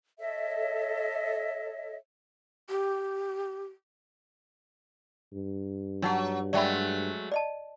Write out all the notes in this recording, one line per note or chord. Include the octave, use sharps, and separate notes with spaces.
A4 C#5 D#5 E5
G4
G2
F#3 D4 D#4 F#5
F#3 G#3 A3 D5 G5 B5
D5 D#5 A5